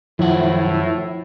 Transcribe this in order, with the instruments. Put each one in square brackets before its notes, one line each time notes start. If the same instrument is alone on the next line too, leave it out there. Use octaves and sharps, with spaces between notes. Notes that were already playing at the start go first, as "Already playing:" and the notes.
[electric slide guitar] F#2 D#3 F#5 [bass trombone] A2 [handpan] F3 [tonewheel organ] E4